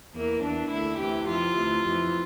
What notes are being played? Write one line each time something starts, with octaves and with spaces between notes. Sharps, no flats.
E2 E3 A#3
E2 E3 D4
D2 D3 E4
D2 C3 E3 G4
F2 C3 E3 F4
D2 C3 E3
F2 E3